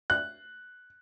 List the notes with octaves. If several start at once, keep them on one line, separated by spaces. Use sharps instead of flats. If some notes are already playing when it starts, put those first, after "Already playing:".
F#6